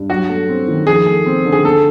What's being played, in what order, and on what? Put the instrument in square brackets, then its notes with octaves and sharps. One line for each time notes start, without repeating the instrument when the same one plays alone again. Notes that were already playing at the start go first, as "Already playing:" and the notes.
Already playing: [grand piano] G2
[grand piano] F#3 [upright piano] F#4
[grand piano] A3
C4
D#3
[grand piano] F3 [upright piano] G#4
[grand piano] A3
C4
D3
[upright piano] G#4
[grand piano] A3 [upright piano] A4